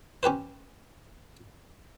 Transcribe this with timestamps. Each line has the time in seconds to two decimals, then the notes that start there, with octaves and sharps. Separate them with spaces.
0.23 C#4 G4 B4 C5